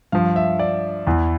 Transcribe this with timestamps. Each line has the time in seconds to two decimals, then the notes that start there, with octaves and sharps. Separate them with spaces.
0.12 G2 F3 F5
0.36 E5
0.59 D5
1.07 E2 E3